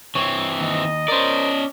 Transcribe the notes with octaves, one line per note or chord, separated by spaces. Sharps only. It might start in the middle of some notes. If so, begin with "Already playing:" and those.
E3 C4 C#5
D#2 D#5
C#4 A#4 C5 D5